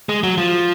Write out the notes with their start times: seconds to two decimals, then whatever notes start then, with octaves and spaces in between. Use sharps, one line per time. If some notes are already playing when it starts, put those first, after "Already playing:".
0.09 G#3
0.23 F#3
0.38 F3